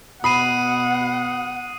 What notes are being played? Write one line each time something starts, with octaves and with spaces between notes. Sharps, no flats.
B2 F#5 B5 D#6 C7 D#7